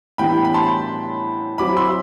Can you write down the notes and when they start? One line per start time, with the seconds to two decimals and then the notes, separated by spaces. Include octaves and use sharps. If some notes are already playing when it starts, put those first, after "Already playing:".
0.18 A2 E3 G3 B3 D4 G5 B5
0.45 B5
0.54 A5 C6
1.58 F#2 F#3 C4 E4 B5 D6
1.77 C6 E6